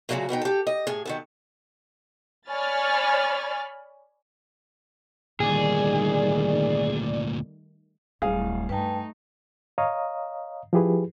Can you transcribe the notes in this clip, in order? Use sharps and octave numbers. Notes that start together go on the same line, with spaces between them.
A#2 C#3 E3 F#3 A3 A#3
B2 B3 D#4 G5
G4 A4
D#5
A2 G#4
D#3 B3 A4
C#5 D5 G#5 B5 F6 A6
D2 A#2 D#3 G3 A3 G#4 D5
D1 G3 G#4 F5
G2 A3 D#4 B4 G5 A5
C#5 D#5 F5 A#5 D#6
F3 E4 G4 G#4 B4